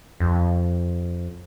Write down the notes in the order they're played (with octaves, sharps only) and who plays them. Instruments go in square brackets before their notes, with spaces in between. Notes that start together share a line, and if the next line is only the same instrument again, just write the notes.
[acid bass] F2